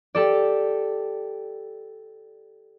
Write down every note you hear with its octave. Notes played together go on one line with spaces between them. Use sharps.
G4 A4 D5